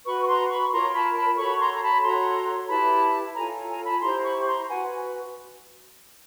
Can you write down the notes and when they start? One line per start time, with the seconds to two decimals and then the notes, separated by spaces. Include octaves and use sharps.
0.05 F#4 B4 B5 C#6
0.21 C#6
0.27 A#5 C6
0.48 B5 C#6
0.62 C#6
0.71 F4 A#4 C#5 A#5 C6
0.93 A5 B5
1.15 A5 B5
1.37 F#4 A4 C#5 B5 C#6
1.59 A#5 C6
1.72 A#5
1.81 A5 B5
2.03 F#4 A4 C#5 A#5 C6
2.65 A#5
2.69 E4 G4 B4 A5 B5
3.35 F4 A4 C#5 G#5 A#5
3.68 G#5 A#5
3.85 A5 B5
4.01 E4 G4 C5 A#5 C6
4.23 B5 C#6
4.38 B5
4.45 A#5 C6
4.67 F#4 B4 F#5 G#5